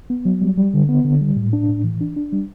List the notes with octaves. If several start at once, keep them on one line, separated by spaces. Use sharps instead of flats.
B3
F#3
G3
G3
D3
B3
D3
G3
A2
D4
A2
E3
D4
D4
G3